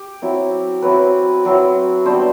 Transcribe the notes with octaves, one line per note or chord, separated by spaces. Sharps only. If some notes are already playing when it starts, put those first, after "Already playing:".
Already playing: G4
F#3 C4 E4
F#3 C4 E4 B4
F#3 C4 E4
G3 B3 D4 C5